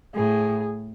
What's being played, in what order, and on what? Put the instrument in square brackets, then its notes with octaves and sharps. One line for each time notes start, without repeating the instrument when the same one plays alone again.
[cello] A2 [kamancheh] G#4